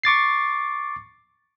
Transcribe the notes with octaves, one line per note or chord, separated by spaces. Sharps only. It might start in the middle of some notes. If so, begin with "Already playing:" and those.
C#6 D6 A6 C7